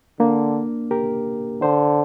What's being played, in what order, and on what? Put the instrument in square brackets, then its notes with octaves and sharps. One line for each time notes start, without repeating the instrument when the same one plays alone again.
[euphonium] D3 [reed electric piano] A#3 D4
[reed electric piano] G4 A#4
[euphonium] D3 [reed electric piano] C5